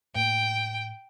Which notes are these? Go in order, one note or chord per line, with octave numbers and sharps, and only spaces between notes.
A2 A#3 G5